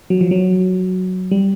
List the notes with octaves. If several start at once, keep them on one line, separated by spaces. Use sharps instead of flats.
F#3
F3
F#3
G3